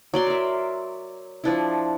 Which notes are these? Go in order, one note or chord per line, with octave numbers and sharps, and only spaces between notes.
F#3 D5 C6
A#4 E5
F3 D4 E4